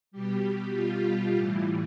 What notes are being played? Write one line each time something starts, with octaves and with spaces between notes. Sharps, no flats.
B2 G3 G4
F4
A2 E3 G3